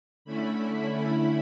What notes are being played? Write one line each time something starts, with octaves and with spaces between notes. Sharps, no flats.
D3 A3 C#4 E4 B5